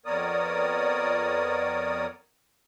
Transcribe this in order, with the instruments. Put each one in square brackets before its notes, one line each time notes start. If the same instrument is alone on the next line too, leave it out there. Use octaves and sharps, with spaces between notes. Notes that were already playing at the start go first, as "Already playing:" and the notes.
[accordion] F2 B3 A#4 C#5 D5 D#6